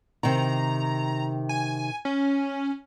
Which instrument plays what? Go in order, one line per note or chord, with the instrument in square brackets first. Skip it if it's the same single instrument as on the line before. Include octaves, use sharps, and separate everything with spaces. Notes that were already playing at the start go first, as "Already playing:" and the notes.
[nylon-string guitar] C3 D#3 [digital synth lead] A#5
[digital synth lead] G#5
C#4